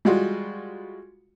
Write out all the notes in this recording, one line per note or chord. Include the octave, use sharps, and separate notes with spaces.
G3 G#3 F4 F#4